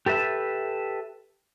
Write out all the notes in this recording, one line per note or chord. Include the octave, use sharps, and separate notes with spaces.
G4 A4 B4 E5